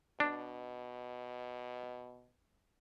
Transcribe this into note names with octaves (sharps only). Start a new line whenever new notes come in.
B2 D4